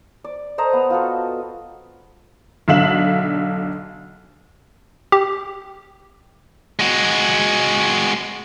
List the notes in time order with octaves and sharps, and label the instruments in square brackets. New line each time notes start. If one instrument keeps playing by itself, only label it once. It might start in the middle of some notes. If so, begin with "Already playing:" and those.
[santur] D5
A4 C5 D#5 A#5
B3
F4 F#4 A4
[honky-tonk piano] B1 D3 E5 F5 E7 F#7
[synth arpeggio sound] G4
[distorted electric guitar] G#3 F#4